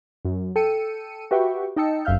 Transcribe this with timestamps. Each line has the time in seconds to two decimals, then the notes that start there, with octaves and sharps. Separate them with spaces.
0.25 F#2
0.56 A4 G5 E6 C#7 D#7
1.31 F#4 G4 B4 E5 G5 C#6
1.76 D#4 D#5 G5 A5 E6 C#7
2.05 G1 F#2 E5 F5 F6 G6